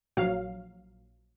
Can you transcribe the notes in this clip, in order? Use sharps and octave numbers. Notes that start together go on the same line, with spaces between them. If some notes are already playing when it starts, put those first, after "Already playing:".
A#1 F#3 F5